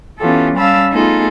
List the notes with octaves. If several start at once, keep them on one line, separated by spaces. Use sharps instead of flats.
E3 B3 C#4 F4 G4 A4
G3 C#4 F5 A5 B5 E6
A3 B3 D#4 F4 G#4 A4